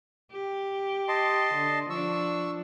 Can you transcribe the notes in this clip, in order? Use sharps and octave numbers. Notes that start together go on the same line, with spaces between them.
G4
D#5 A5 C6
D3
F3 D4 C#6 E6